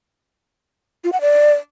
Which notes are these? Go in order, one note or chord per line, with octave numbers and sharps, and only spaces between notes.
F4
F#5
D5